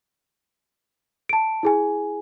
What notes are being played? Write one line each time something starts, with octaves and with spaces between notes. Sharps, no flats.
A5 D7
E4 G#4 G#5